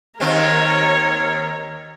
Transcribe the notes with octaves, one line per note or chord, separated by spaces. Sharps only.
D#2 D#3 C4 A#4 C#5